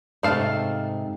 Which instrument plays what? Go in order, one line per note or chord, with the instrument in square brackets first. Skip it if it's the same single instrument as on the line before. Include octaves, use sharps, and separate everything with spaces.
[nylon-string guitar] G#2 C3 [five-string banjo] A3 F5 A5